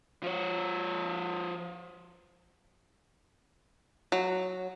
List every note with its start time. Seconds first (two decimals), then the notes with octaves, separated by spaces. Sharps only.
0.23 F3 C#5
4.12 F#3